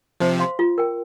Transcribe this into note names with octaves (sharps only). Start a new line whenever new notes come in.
C3 F3 C5
F5 C6
F4
A#4 G5